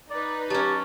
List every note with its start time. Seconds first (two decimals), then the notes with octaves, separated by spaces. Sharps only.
0.10 D#4 B4 D5
0.50 F#3 C#4 G4 A5